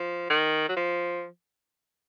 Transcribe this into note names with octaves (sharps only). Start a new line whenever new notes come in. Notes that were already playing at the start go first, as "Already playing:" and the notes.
Already playing: F3
D#3
F#3
F3